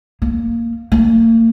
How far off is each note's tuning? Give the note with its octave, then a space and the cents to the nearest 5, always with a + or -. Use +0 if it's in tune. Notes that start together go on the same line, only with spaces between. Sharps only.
A#3 -10
A#3 -40